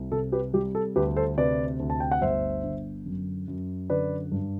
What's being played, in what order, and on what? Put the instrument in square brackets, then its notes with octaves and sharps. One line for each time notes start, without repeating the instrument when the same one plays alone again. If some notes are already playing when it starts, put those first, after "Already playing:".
Already playing: [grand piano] C2
C3 A4
G4 B4
G3 G4
A4
D2 G4 B4
A4 C5
C3 B4 D5
D2
A5
G5
F#5
G1 C5 E5
D3
F#2
F#2
D3 B4 D5
G2